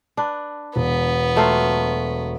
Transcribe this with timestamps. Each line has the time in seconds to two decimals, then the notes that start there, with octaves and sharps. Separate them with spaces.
0.17 D4 B4
0.76 E1 B3
1.36 F#3 A3 F4